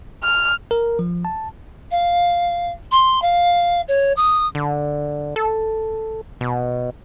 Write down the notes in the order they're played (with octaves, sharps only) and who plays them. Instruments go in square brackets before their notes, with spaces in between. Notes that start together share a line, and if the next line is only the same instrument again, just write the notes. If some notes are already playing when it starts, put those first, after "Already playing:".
[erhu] F6
[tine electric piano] A#4
F3
A5
[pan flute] F5
C6
F5
C#5
D#6
[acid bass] D3
A4
B2